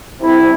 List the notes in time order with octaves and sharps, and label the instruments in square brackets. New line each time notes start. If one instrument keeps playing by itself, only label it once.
[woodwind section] D2 C3 G3 C4 E4